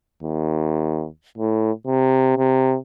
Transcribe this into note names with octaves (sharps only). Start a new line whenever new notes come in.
D#2
A2
C3
C3